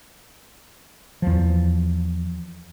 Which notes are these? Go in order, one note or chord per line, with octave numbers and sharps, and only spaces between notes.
E2 F3